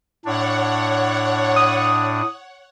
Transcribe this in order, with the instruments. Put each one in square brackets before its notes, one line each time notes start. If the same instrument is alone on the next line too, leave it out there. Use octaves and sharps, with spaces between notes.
[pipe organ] A2 D4 [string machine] C#5 F#5
[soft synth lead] D#6